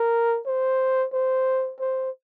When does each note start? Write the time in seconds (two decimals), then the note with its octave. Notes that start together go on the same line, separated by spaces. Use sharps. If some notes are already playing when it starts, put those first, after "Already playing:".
Already playing: A#4
0.46 C5
1.13 C5
1.80 C5